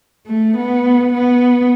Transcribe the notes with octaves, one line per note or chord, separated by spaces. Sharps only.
A3
B3
B3